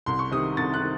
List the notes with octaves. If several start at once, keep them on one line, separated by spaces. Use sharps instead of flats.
C2 C6
C#6
C3 D#3 D#6
C2 A6
F#6
D#3